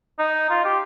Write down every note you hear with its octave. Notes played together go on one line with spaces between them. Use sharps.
D#4
F4
G4